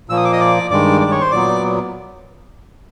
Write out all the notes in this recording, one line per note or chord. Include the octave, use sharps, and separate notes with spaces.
A#2 F3 A#3 E6
D#6
D6
D#5 D#6
D5 D6
G2 D#3 G#3 D5 D6
D5 D6
C#5 C#6
C5 C6
A#2 F#3 B3 D5 D6